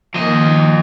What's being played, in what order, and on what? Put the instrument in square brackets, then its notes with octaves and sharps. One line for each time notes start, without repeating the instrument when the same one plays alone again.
[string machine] D#3 A#3 [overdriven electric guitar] F3 D#5